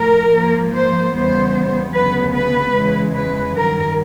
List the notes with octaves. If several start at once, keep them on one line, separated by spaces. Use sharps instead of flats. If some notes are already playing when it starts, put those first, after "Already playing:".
Already playing: A2 F3 A3 A#4
G#2 F3 A#3
C5
E2 C#3 E3 G3 B3 C5
D2 C#3 F#3 B3 B4
B4
E2 C#3 E3 G#3
B4
G2 D#3 F#3 A#4